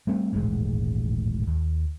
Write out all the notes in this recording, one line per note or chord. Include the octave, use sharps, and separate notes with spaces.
G3 A3 C4
D#1 A1 G#2 G#3
D#2